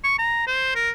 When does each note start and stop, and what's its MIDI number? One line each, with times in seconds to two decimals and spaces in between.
0.04 0.17 85
0.19 0.43 82
0.47 0.72 72
0.75 0.90 70